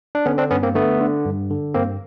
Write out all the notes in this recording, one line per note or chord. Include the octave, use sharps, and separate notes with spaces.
D4
D3 B3 C#4
C4 D4
G2 B3 C#4
A#3 C4
D3 A3 B3
D3
G2
D3
G2 A#3 C4